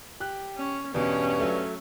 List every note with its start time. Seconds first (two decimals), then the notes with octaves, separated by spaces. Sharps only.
0.20 G4 F#6
0.57 C#4
0.94 E2 G2 B2 C#4
1.39 F#3 A3